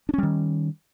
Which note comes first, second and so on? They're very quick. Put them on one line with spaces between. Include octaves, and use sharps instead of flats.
D4 C#4 G3 D#3